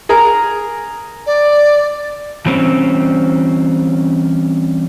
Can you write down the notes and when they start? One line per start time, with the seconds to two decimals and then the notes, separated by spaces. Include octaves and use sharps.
0.09 G#4 A#4 A#5
1.27 D5
2.46 E3 G3 C4 C#4